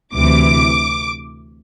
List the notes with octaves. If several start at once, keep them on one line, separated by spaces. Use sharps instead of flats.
D2 C3 E3 D6